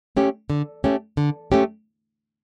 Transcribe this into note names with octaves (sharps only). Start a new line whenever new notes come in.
A3 C#4 G4
D3
A3 C#4 G4
D3
A3 C#4 G4